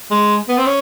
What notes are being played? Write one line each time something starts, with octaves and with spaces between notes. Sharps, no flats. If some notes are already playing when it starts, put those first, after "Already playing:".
G#3
B3
C4
C#4